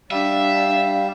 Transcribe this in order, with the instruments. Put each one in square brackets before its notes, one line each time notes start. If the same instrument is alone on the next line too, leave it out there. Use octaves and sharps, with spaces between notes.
[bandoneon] G3 [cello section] D4 [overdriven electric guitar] E5 [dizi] F5